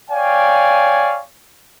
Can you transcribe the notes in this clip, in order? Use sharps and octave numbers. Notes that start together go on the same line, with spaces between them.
C#5 D5 F5 G5 G#5